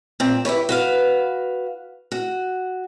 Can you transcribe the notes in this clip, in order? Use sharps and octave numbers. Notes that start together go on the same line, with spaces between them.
A#2 C4
E4 G4 B4 C#5
F#4 B4 F5
F#4